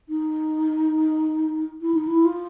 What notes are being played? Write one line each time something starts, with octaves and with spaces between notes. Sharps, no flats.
D#4
E4
D#4
E4
F4